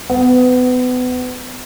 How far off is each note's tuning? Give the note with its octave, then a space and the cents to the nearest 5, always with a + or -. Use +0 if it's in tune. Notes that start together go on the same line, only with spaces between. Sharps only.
B3 +30